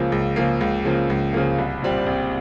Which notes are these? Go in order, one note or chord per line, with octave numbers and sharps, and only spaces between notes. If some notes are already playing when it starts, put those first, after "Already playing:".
Already playing: C#2 C#3 F3 A#3
C#2
C#3 F3 A#3
C#2
C#3 F3 A#3
C#2
C#3 F3 A#3
C2
A#2 G3 C4
C2